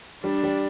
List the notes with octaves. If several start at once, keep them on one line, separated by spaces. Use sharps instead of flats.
G3 D4
G3